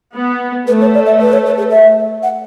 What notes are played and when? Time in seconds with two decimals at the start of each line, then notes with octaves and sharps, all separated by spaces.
0.16 B3
0.67 A3 B4
0.81 C#5
0.94 D5
1.06 E5
1.21 B4
1.33 C#5
1.46 B4
1.58 G#4
1.71 E5
2.23 F#5